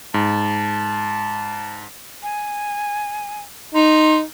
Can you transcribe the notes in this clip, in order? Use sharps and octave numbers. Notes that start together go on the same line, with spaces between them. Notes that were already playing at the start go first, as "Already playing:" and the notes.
G#2 A5
G#5
D#4 C6